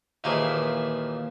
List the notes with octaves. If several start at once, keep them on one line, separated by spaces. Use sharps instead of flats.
D#2 A#2 E3 F3 D#4 G#4